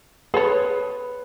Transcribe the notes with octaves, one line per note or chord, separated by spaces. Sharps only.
G#4 A4 B4 C#5